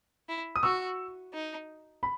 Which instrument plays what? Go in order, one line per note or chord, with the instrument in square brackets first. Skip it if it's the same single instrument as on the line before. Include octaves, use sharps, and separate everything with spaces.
[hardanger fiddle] E4
[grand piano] D#6
[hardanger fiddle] F#4 [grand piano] C#6 E6
[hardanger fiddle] D#4
[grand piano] B5